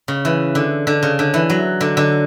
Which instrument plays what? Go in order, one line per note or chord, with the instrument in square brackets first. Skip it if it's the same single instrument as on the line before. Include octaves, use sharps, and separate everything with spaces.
[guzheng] C#3
E3
D3
D3
C#3
D3
E3
F#3
D3
D3